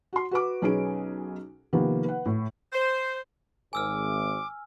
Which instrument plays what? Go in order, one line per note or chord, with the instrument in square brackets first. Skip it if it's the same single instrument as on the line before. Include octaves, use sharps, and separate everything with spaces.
[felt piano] F#4 C6
F#4 B4 D6
B1 C#4 D#4 G#4 B4 D7
C3 D#3 F3 A#3 B3
B4 F#5
A2
[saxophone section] C5
[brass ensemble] G#1 [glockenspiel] G#5 E6 F6 [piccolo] D6